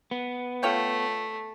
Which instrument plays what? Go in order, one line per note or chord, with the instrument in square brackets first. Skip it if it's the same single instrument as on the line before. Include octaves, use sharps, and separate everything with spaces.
[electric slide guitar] B3
[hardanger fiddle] A3 [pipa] F4 C#5 G5